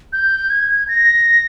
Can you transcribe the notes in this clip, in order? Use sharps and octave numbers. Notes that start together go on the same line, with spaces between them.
G6
G#6
A#6